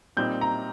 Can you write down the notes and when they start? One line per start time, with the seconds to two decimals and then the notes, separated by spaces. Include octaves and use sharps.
0.17 A#2 G3 C4 D#4 G6
0.41 A#5